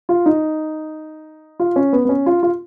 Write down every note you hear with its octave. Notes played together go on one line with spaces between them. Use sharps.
F4
D#4
F4
C#4
B3
B3
C#4
F4
F4